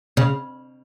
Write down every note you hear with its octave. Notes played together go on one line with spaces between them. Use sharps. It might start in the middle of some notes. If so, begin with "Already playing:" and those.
C#3